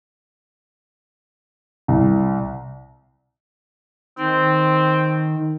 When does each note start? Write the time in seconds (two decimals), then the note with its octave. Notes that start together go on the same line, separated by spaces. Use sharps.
1.88 C2
4.19 D#3 C4